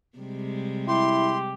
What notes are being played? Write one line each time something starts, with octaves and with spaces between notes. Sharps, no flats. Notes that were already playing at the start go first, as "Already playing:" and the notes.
C3 G3 G#3
E4 G4 C6